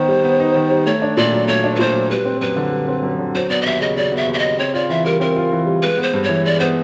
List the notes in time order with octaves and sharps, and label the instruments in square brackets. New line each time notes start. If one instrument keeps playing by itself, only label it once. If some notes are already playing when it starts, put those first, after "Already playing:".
Already playing: [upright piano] D#3 B3 D#4 [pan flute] C5
[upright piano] G3
B3
D#4
D#3
G3
[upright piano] A3 [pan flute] C#5
[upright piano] D4
[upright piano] A#2 [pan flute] D5
[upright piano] F#3
[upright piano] A3 [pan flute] C#5
[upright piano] D4
[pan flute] B4
[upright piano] A#2 [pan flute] C5
[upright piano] F#3
[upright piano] G3 [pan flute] B4
[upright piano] C4
[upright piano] F#2 [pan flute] B4
[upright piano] D3
G3
C4
F#2
D3
[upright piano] F#3 [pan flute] C5
[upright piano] B3 [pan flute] D5
[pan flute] D#5
[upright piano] D#2 [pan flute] E5
[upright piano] C#3 [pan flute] D#5
[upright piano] F#3 [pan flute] D5
[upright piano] B3 [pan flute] E5
[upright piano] D#2
[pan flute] E5
[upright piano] C#3 [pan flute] D#5
[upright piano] C4 [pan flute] C#5
[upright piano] F4 [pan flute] D5
[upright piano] E3 [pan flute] E5
[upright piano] G3 [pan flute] A#4
[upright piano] C4 [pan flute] A#4
[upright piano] F4
E3
G3
[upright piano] G#3 [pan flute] B4
[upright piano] B3
[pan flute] C5
[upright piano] G2
[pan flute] C#5
[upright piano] E3
[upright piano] G#3 [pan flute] D5
[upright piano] B3 [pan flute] C5